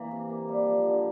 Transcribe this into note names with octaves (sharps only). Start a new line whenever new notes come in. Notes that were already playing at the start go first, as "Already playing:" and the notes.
Already playing: E3 A#3
C3
A#3
G3
F3
D3